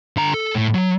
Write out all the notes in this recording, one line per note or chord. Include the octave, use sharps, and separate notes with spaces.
D3 A#5
A4
A2
F#3